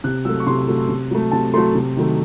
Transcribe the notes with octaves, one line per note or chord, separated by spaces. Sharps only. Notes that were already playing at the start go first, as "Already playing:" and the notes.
C3 F#6
F#3 A3 E6
C#6
C3 C6
F#3 A3
C3
F#3 A3
C3 A5
F#3 A3 C6
C3
D#3 F#3 A3